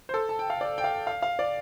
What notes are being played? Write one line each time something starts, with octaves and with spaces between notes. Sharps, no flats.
C5
A4
A5
G5
F5
D5
G5
F5
F5
F5
D5